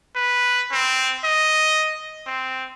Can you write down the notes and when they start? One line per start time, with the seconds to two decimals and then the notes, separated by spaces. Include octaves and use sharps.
0.16 B4
0.72 C4
1.24 D#5
2.27 C4